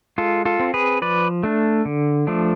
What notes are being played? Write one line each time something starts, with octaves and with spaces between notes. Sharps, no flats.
G#3 F4 A4
F4 A4
C4
G#4 B4
F3 B4 D5
A3 D4
D3
F3 A3 D4